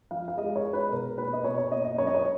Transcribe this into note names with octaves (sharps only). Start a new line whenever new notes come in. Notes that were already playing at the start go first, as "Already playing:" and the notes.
F3 F5
F5
G#3 D#5
C#5
G#3
B4
B2 A#4
A#3 B4
D#5
B2 C#5
C#5
A#3 D#5
D#5
F#2 C#5
D#5
C#5